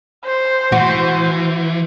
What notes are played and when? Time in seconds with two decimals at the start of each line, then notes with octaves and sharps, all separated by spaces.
0.25 C5
0.72 E3 F#4